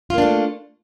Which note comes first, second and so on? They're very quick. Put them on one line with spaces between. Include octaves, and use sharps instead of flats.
F4 A#3 D4 A3